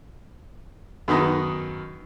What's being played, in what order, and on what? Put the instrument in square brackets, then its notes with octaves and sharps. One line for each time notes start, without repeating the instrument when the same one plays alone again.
[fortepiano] F#2 D#3 B3 D#4 A#5